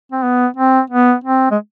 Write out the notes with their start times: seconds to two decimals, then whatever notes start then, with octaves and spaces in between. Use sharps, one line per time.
0.12 C4
0.23 B3
0.57 C4
0.90 B3
1.24 C4
1.51 G#3